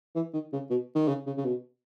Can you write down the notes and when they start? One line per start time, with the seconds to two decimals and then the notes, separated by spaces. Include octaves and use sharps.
0.15 E3
0.33 D#3
0.53 C#3
0.70 B2
0.95 D#3
1.08 C#3
1.27 C#3
1.37 C#3
1.45 B2